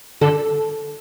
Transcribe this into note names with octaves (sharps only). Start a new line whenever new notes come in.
D3 A4